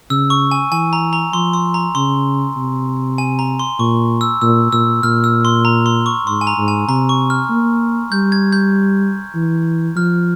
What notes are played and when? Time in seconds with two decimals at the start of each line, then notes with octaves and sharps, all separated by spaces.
0.10 C#3 E6
0.30 C#6
0.51 G#5
0.72 E3 G#5
0.93 A#5
1.13 A#5
1.33 F3 C6
1.53 C6
1.74 A#5
1.95 C#3 C6
2.57 C3
3.18 G#5
3.39 A#5
3.59 C6
3.79 A#2 C#6
4.21 E6
4.41 A#2 E6
4.72 A#2 E6
5.03 A#2 F6
5.24 E6
5.45 C6
5.65 A#5
5.86 C6
6.06 C#6
6.27 G#2 C6
6.41 G#5
6.47 A#5
6.57 G#2
6.68 G#5
6.88 C3 A#5
7.09 C#6
7.30 F6
7.49 A#3
8.12 G3 G6
8.32 G#6
8.52 G6
9.35 E3
9.96 F3 F6